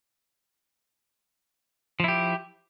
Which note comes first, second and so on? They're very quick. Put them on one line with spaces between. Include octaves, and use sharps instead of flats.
F3 E4 G4